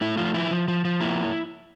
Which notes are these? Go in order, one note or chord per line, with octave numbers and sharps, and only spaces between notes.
A3 E4
F3 F4
F3 E4
F3
F3
F3
A#3 E4